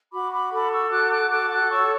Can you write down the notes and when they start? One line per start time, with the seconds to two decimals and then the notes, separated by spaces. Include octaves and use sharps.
0.13 F#4 B5 D6
0.32 B5 D6
0.52 A4 B5 D6
0.72 C#6 E6
0.91 F#4 D6 F#6
1.11 D6 F#6
1.31 A4 D6 F#6
1.50 D6 F#6
1.70 C#5 C#6 E6